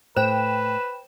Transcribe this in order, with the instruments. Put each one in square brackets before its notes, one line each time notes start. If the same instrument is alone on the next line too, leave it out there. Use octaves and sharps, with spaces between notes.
[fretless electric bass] A2 [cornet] B4 [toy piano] C5 [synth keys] G5 E7